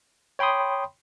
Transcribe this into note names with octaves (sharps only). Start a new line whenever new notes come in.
C#5 G5 B5 C6 D#6